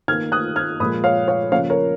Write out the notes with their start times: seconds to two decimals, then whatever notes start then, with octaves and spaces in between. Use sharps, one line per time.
0.08 D#3 F6 G#6
0.12 A#3
0.32 D#6 F#6
0.56 F6 G#6
0.80 A#2 F3 G#3 B5 D#6
1.04 C#5 F5
1.28 C#5 F5
1.52 C#3 F3 A#3 C#5 F5
1.70 A#4 C#5